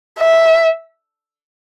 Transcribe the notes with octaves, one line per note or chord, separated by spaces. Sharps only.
E5